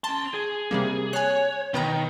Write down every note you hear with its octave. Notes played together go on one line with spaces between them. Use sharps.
C#4 A5 C6
G#4
C3 G3 A#3
C#5 G#5 F#6
B2 D#3 B4 A#5